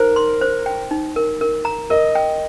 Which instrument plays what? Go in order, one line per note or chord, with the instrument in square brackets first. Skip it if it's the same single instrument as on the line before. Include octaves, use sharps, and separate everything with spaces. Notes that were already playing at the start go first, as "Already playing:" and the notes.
Already playing: [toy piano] D#4 C5 [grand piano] A#4
[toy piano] C6
C5
G5
D#4
A#4
A#4
A#5
[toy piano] A#4 [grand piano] D#5
[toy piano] G5